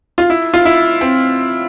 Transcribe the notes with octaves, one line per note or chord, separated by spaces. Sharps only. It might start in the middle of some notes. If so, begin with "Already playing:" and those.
F4
E4
F4
E4
C4